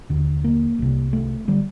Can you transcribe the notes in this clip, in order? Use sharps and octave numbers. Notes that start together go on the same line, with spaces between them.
D#2 D3
A#3
C2 C3
A3
D3 G3